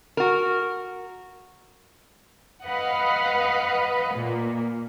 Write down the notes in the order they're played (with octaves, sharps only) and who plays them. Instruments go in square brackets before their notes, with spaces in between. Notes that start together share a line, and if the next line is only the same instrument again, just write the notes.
[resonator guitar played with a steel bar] F#4 A#4
[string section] B4 D#5 F5 F#5
A#2 A#3